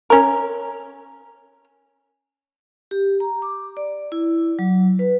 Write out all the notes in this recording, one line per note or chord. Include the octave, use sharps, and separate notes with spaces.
C#4 A#4
G4
A#5
D6
D5
E4
F#3
B4